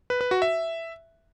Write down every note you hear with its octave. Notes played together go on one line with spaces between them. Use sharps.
B4
B4
F#4
E5